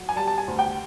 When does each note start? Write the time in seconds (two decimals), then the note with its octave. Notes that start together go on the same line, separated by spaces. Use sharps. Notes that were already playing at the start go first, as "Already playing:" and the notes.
Already playing: F#3
0.09 G#5
0.16 G3 A5
0.28 A5
0.38 G#5
0.48 D2
0.59 G5